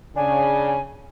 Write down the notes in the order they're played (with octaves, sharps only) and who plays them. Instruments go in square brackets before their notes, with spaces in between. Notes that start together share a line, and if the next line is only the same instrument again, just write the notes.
[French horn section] C#3 [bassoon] D4 [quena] G#5